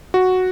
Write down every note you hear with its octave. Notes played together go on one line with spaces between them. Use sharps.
F#4